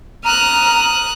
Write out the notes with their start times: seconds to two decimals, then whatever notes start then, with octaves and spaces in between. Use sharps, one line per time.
0.25 A#5 D#6 F6 F#6